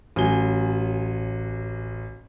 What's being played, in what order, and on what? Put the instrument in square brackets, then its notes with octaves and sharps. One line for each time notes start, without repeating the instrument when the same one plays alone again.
[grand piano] A1 F#3 G#5 G7